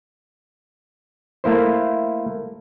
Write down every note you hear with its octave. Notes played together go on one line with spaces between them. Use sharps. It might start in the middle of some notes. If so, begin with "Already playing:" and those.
A3 A#3 E4 C5